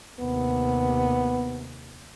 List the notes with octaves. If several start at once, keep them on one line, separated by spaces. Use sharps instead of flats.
D#2 C3 B3